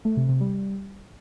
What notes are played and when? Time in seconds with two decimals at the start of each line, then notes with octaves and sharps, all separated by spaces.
0.05 A3
0.17 C3
0.29 C3
0.40 G3